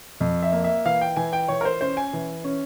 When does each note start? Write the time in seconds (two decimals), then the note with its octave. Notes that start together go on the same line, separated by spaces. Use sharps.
0.20 F2
0.42 E5
0.52 A#3
0.64 E5
0.86 E3 F5
1.01 G5
1.16 E3 G#5
1.33 G5
1.48 E3 C#5
1.61 A#4
1.65 C5
1.81 C#4 C5
1.97 G#5
2.13 E3
2.44 C#4